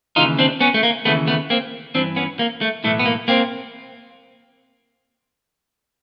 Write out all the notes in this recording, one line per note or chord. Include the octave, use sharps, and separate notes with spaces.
D#2 C#3 E3 D#4 F4
C4 D4
B3 C#4
A3
A#3
D#2 C#3 E3 A3 B3
A3 B3
A#3 C4
G2 E3 C4 D4
B3 C#4
A#3
A3
B1 A2 E3 A3
B3
A#3
A#3 C4